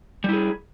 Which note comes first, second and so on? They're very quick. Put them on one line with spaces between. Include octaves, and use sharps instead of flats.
G3 E4 G#4